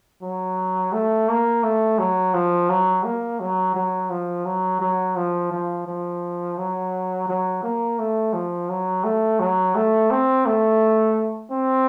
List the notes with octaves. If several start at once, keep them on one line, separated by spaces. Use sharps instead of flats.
F#3
A3
A#3
A3
F#3
F3
F#3
A#3
F#3
F#3
F3
F#3
F#3
F3
F3
F3
F#3
F#3
A#3
A3
F3
F#3
A3
F#3
A3
C4
A3
C4